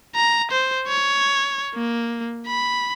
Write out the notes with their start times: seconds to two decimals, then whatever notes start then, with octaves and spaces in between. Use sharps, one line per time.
0.15 A#5
0.51 C5
0.87 C#5
1.74 A#3
2.47 B5